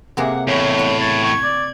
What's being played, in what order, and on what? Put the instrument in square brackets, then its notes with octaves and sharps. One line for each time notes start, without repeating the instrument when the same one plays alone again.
[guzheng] C3 A#3 G#4 [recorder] F#5
[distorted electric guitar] E2 A2 [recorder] C#5
[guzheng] F#5
[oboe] C#5 [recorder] A6
[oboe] C#6 [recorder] G#6
[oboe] D5